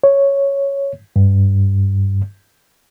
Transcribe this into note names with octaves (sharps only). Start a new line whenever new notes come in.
C#5
G2